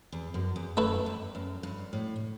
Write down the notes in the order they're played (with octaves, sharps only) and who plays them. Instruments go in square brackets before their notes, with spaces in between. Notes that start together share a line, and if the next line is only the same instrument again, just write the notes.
[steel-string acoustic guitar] E2
F#2
E2
[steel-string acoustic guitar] F#2 [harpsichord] A3 E4 B4
[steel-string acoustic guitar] G2
F#2
G2
A2